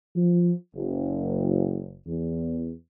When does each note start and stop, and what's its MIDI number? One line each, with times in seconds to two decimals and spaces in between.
0.16 0.53 53
0.75 1.98 30
2.07 2.72 40